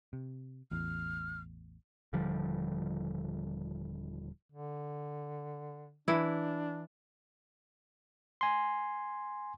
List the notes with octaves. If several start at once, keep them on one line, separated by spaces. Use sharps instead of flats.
C3
A1 E2 F6
D#1 D3 F3 G3
D3
E3 D4 E4
G#5 C6